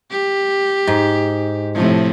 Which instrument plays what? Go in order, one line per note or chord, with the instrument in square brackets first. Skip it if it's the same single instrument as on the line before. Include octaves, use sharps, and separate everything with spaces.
[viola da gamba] G4
[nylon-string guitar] G#2
[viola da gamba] A2 C3 F3